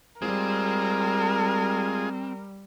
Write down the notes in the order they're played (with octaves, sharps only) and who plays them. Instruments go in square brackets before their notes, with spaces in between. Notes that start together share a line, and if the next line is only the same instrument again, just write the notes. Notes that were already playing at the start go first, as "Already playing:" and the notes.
[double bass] G3 [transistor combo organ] G#3 F4 G#4 [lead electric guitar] C4 [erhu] A#4